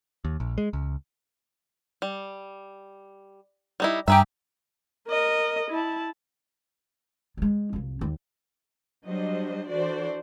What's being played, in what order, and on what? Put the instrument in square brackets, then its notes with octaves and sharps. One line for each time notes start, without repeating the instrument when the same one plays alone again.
[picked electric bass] D#2
A#1
G#3
C#2
[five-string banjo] G3
G3 D#4 E4
[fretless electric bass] G2 [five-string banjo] G4 G#4 E5 [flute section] G5 A#5
[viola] A#4 D#5
E4 A5
[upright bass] G3 G#3
C2 F2
D#2
[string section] F#3 G3 D4 C5 D#5
E3 D4 F#4 A4 C5 D5